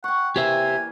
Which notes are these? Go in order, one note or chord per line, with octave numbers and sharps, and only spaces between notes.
F#5 G5 C#6
E3 A#3 G4 C5 D5 E5 G#5